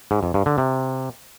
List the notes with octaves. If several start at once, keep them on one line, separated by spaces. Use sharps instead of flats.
G#2
F2
G2
D3
C3